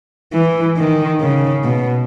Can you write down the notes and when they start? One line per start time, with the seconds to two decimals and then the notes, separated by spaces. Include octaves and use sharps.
0.33 E3
0.77 D#3
1.21 C#3
1.64 B2